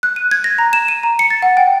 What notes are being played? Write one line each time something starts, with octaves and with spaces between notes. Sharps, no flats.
F#6
D#7
G#6
A#6
A#5
E7
D#7
A#5
C#7
A6
F#5
G5